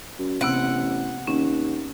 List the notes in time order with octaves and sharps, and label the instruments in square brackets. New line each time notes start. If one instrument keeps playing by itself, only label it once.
[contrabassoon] F#2
[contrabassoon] A1 [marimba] C3 B3 C4 [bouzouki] F#5
[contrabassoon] D#2 [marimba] C#4